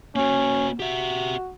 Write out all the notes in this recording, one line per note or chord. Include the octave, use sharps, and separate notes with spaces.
A#3 C#4 F#4
F#4 G4 E5